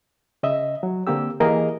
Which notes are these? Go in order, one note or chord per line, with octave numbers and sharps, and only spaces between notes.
C#3 D#5 E5
F#3
D3 A#3 C4 G4 E6
E3 A#3 G4 G#4 A#4 D#5